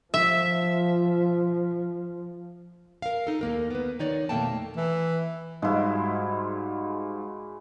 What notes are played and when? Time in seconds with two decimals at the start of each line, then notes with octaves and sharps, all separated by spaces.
0.14 F3 E5
3.02 A#4 F5
3.27 D#4 A4
3.41 D#2 A#3 A#4
3.70 B3 B4
3.99 D#3 D#4 C#5 D5
4.29 F2 B2 A3 A#3 G5 A5
4.77 E3
5.62 G#2 G3 G#3 E4 F#4 F5